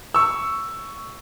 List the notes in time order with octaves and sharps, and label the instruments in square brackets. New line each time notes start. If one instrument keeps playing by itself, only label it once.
[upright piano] C#6 E6